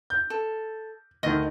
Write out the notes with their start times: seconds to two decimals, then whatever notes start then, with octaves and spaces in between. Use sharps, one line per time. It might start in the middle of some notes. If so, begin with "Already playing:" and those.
0.10 G6
0.30 A4
1.23 D2 D#3 D#5